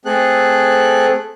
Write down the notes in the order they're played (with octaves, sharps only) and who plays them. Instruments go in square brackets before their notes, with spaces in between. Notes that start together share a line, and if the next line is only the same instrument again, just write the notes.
[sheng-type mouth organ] A3 C4 G#4 A4 F#6